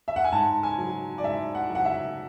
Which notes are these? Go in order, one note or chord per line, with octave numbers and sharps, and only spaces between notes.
E5
F#5
G#5
G#2 A5
G#5
F#3
D5
G#2 E5
F#5
F#3
F#5
E5